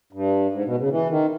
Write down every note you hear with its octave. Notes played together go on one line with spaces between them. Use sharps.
G2
G#2
B2
C#3
E3
D#3